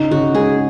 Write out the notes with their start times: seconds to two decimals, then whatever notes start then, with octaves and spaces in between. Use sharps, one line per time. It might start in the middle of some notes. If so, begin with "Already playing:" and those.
Already playing: C#3 D#4
0.11 C#3 F#4
0.34 G#3 G#4